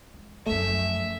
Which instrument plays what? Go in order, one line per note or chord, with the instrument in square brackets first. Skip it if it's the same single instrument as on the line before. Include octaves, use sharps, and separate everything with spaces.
[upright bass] G#3
[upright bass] F#2 F3 [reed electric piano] A3 [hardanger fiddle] E5